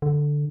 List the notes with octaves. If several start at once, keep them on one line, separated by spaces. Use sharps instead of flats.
D3